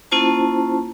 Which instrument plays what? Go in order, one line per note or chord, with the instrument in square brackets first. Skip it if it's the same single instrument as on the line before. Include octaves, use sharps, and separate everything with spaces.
[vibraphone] A#3 C#4 E4 F4 C5 A5